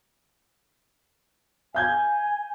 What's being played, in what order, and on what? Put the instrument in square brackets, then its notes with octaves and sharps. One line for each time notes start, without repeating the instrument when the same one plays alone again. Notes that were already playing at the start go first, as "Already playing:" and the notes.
[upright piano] F5 G6 G#6 [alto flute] G#5